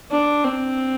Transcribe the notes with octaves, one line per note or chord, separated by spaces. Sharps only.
D4
C4